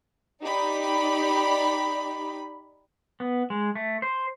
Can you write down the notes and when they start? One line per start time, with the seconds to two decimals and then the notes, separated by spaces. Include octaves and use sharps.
0.44 D#4 G4 D5 B5
3.20 B3
3.50 G#3
3.75 A3
4.02 C5